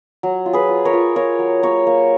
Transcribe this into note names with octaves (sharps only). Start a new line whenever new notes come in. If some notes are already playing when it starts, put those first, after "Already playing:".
F#3
F4
G#4 B4
F4
A#4 C#5
F4
F4 A#4 C#5
F#3
A#3 A#4 C#5
A#3